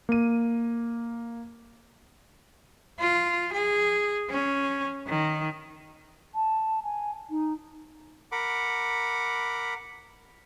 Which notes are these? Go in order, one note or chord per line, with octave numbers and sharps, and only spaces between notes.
A#3 D#7
F4
G#4
C#4
D#3
A5
G#5
D#4
A#4 F#5 B5 D6